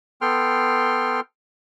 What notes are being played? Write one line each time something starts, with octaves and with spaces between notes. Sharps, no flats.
B3 A4 G5 C6 F6